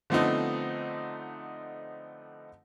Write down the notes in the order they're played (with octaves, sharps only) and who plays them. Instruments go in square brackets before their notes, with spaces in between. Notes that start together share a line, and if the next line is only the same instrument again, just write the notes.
[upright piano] D3 F3 A3 B3 C4 D#4